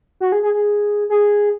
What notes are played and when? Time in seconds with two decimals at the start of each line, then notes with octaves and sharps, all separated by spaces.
0.20 F#4
0.32 G#4
0.43 G#4
0.54 G#4
1.10 G#4